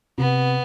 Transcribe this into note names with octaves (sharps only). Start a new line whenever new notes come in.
C3 B3